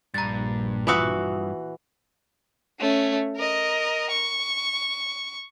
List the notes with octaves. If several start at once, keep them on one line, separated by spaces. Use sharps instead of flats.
A#1 G2 A#5 A6
E3 F4 F#4 D#6 E6
A3 C#4
A#4 D#5
C#6